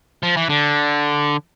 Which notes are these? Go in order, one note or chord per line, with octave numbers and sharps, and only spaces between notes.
F3
E3
D3